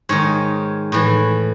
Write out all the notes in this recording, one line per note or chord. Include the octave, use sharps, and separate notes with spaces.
G#2 D#3 C#5
A2 E3